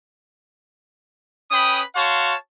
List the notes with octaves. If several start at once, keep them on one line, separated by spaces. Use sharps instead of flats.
C#4 B4 G5 B5 D#6
F#4 C#5 F5 A5 C6 C#6